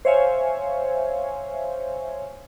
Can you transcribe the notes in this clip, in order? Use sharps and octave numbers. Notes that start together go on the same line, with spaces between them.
C5 C#5 E5 F5 G#5